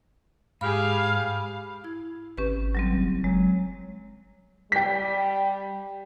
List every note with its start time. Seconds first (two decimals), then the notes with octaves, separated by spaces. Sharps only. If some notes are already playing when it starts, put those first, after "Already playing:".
0.61 G#2 G4 G#4 F5 B5
1.84 E4 G#6
2.38 G#1 C#4 G4 B4
2.75 F#3 G3 C4
2.96 F#1
3.24 F#3 G#3
4.72 G3 G5 B6